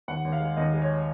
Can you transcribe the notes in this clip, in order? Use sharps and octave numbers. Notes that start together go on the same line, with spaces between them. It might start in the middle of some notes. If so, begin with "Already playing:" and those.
D#2 F#5
D#2
F5
G#3
D#2 D#5
G#3
C#5